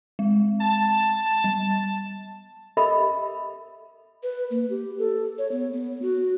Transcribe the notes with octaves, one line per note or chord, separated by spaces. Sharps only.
G#3
A5
G3
G4 A4 A#4 D#5 E5 B5
B4
A#3
G4
A4
C#5
B3
B3
F#4